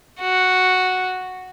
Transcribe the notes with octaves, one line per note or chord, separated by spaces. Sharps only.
F#4